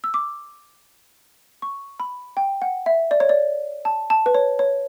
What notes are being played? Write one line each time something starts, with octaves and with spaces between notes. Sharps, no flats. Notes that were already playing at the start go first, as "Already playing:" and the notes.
E6
D6
C#6
B5
G5
F#5
E5
D5
C#5
D5
A5
A5
B4
C#5
C#5